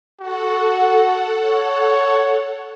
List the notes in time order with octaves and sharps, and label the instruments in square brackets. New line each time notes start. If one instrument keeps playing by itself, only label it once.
[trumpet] F#4 [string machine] A4 F#5
[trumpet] C#5